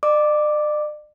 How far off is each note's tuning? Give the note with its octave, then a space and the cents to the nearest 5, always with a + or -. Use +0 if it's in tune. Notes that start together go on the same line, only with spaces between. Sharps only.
D5 +40 D6 +0